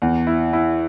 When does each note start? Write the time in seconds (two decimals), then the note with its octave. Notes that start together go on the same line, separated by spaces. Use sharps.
0.02 E2
0.27 E4
0.53 E4